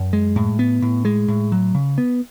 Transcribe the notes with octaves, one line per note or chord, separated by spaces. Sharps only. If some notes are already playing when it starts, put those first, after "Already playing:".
Already playing: F#2
G#3
A2
B3
A2
G#3
A2
F#3
C#3
B3